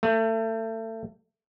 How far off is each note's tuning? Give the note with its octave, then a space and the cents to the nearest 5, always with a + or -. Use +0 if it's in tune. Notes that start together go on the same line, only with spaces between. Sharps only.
A3 +30